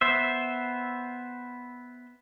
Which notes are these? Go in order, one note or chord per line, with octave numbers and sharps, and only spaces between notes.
B3 C5 E5